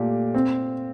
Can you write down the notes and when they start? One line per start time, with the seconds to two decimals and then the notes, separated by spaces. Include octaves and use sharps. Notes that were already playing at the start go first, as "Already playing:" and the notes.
Already playing: A#2 A3 G4
0.35 C4